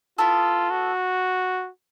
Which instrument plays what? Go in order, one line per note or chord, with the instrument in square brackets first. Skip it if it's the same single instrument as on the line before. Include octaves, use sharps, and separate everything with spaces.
[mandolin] B3 E4 A4 [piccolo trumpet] F4
[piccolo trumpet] F#4